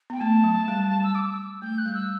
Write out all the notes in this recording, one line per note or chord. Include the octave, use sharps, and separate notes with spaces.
B3 G5
A3 A5
F#3
G3
G3
E6
D6
E6
A3 G6
F#6
G3
E6